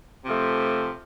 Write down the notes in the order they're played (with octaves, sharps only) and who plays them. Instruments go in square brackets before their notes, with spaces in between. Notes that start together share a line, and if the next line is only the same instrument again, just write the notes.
[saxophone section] C3 F3 A3